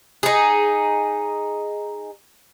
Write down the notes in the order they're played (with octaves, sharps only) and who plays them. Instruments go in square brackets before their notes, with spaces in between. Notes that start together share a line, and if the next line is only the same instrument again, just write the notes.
[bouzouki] D#4 G#4